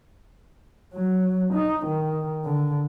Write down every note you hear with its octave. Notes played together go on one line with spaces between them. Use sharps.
F#3
D#4
D#3
D3